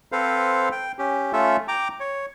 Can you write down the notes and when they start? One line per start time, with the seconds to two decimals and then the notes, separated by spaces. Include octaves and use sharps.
0.12 C4 A4 B4 C5 F5
0.72 G5
0.99 C#4 G4
1.33 A3 C#4 F4 A4 E5
1.68 G5 A#5 D6
2.00 C#5